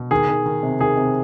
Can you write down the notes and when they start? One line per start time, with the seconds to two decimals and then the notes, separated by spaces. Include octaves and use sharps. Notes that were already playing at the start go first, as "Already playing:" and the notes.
Already playing: B2
0.11 D#3 G#4
0.29 D#3
0.46 D#3
0.63 C3
0.81 D#3 G#4
0.97 C3